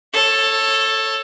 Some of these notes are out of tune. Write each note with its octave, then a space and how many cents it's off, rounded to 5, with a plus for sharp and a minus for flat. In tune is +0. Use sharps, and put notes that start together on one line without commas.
A4 +5 C#5 -20